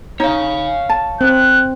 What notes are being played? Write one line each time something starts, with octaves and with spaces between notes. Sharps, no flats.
D#4 C#5 F5
A5
C4 F#6